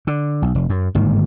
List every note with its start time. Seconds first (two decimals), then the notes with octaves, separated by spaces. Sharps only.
0.07 D3
0.42 B1
0.55 F1
0.69 F#2
0.95 G1 G#2 D#3 A#3